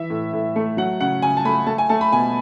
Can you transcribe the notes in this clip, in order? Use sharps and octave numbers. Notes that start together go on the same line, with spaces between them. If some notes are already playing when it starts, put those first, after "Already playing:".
Already playing: E3 E5
A2
A2
A3
F#3 F#5
C#3 F#5
C#3 G#5
A5
A3 B5
A3 A5
G#5
A3 A5
B5
B2 G#5